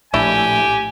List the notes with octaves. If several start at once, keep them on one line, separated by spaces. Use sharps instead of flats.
A#1 A2 E3 D4 E4 G4 G#5